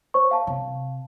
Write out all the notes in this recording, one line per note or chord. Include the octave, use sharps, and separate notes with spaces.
C5 C#5 C#6
F5 A5
C3